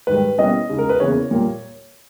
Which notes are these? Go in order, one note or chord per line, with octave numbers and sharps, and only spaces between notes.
G#2 D#3 G3 B4
B2 G3 A#3 C#4 E4 D#5
C#3 G#3 D#4
A#4
B4
E2 C#3 E3 A#3 C#5
A#2 G3 A#3